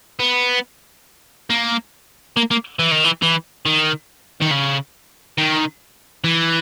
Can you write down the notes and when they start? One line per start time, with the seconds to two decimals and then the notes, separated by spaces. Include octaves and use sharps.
0.20 B3
1.50 A#3
2.37 A#3
2.51 A#3
2.79 E3
2.91 D#3
3.05 E3
3.22 E3
3.66 D#3
4.42 D#3
4.51 C#3
5.38 D#3
6.24 E3